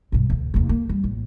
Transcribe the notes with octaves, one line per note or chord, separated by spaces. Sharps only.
B1 G2
D2 A2
F1 D#2
A#3
G3
A1